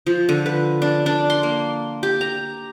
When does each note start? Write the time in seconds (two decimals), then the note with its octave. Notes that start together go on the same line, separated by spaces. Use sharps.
0.07 F3
0.29 D3
0.46 B4
0.82 D4
1.06 D4
1.30 C6
1.43 A#3
2.03 G4
2.21 A#5